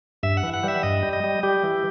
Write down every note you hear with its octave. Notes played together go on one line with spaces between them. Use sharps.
G2 E5
F#5
E3
F#5
G3 E5
G2 D#5
G3
D#5
G3
G3 G4
E3